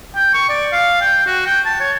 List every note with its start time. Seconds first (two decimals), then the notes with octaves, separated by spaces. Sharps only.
0.16 G5
0.34 C#6
0.49 D5
0.72 F5
1.01 G5
1.26 F#4
1.47 G5
1.66 A5
1.80 C#5